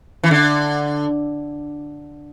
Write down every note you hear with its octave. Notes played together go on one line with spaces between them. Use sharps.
E3
D3